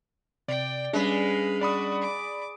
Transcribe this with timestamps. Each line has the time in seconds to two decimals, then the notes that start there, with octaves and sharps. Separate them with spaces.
0.48 C3 D5 G5
0.93 G3 G#3 C#4 D4 B4 F5
1.61 F#4 D5 B5 D#6
2.01 D6